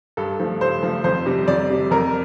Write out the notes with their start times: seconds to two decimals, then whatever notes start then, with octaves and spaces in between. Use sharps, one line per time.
0.17 G2 A4
0.39 F3 A3
0.61 G2 C5
0.83 F3 A3
1.04 F2 C5
1.26 C3 G3
1.48 F2 D5
1.69 C3 G3
1.91 F2 A#4